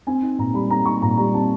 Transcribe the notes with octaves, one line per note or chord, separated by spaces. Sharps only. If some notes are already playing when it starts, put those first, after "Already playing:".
C4 G#5
D#4
A#2 A#5
G3 B5
C4 A#5
D#4 C#6
A#2 A#5
G3 A#5
C4 A5